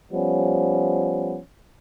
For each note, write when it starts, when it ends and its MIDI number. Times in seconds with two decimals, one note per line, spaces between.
0.12 1.38 53
0.12 1.38 55
0.12 1.38 59
0.12 1.38 61